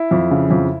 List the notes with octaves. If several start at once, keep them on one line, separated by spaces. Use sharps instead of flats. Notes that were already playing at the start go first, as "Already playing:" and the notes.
Already playing: E4
F2
C#3
F2